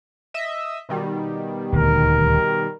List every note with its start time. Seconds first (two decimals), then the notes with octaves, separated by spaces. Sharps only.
0.34 D#5 E5
0.89 B2 D#3 G3
1.73 D#1 D2 A#4